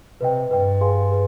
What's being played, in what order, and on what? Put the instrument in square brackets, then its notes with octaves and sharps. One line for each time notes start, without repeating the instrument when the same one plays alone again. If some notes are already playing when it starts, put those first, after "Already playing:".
[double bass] C3 [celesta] B4 D#5 G5
[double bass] G2 [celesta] B4 D#5 G5
[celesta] G#4 B4 F5 G#5 C6
G#4 B4